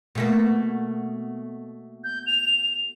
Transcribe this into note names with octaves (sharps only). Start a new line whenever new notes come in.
B2 A3 A#3
G6
F7